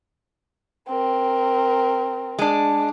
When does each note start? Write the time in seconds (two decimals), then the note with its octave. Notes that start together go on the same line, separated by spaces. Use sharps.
0.88 C4 A#4
2.39 G#3 D4